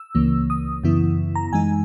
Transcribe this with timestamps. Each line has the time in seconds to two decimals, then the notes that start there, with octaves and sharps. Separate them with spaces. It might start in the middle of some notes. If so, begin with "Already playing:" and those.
Already playing: E6
0.15 C#2 C#3 E3 A#3
0.50 D#6
0.83 F#2 C#3 E3 B3 E4
1.35 A#5
1.52 F#2 E3 G#3 D#4 G#5